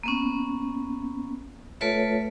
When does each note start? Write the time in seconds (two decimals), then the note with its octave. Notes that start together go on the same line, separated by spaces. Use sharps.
0.03 A#3 B3 C#4
1.81 A3 F4 A4 B4 C#5 E5